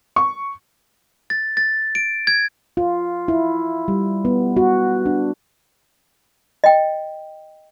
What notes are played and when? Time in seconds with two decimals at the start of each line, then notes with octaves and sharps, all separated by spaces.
0.16 C#6
1.30 A6
1.57 A6
1.95 D7
2.27 G#6
2.77 F4
3.28 E4
3.88 G3
4.25 B3
4.57 F#4
5.06 D4
6.64 D#5 G5